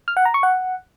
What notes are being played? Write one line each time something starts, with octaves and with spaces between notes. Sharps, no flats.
F6
F#5
A#5
C#6
F#5